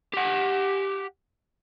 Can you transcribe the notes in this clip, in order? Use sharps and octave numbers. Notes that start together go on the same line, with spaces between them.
G4 F#5